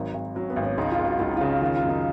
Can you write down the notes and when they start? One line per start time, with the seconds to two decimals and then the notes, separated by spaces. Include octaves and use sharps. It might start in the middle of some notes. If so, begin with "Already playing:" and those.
Already playing: G#1 F#3 D#4
0.14 G#1
0.35 F#3 C#4
0.50 B3
0.56 G#1
0.63 C#4
0.78 C#2 D#4
0.92 F4
0.99 C#2
1.06 F#4
1.19 C#2 F4
1.29 D#4
1.37 C#3 F4
1.61 D#3 F4
1.75 F4
1.82 F#2
1.89 D#4